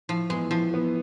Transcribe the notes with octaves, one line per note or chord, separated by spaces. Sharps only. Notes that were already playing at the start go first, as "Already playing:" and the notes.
A2 F3
E3 G#3 B3
A2 F3
E3 B3